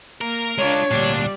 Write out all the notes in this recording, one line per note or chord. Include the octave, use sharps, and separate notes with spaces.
A#3 A#4
G#3 D4 F4 C#5
D2 A#2 G3 D4 D5